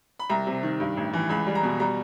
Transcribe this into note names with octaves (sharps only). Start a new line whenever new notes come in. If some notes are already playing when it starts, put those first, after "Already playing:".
B5
C2 A#5
C3
D#3
G2
A1
E3
C#2 B5
G3
A#5
B2
G3 A#5